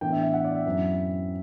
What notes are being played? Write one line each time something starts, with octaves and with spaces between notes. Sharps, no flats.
A2 E3 B3 D4 G5
E5
E5
F#5
D5
E5
F#2 F#3 C4 E4